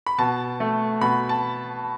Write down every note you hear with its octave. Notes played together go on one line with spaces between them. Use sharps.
B5
B2 A5
A3
B2 B5
A5